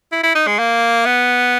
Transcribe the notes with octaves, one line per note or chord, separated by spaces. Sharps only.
E4
E4
D#4
G#3
A#3
B3